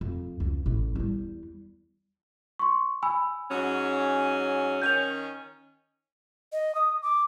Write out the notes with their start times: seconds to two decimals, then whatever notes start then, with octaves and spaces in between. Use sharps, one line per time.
0.01 F2
0.40 C#2
0.66 A1 A2
0.95 E2 G3
2.59 C6 C#6
3.03 G#5 B5 E6
3.50 G#2 F#3 C#4
4.82 D#3 C#4 G6 F7
6.52 D#5
6.75 D#6
7.02 D6